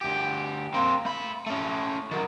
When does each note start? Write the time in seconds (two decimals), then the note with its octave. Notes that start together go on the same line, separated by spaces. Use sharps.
0.01 D2 G4
0.74 A#3 C4
1.05 A3 B5
1.46 A3 C#4
2.11 D#3 F#3